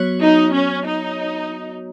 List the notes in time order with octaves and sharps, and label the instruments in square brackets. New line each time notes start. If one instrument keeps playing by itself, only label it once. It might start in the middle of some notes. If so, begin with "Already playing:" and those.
Already playing: [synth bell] F#3 B3 F#4 C#5
[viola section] D#4
C#4
D#4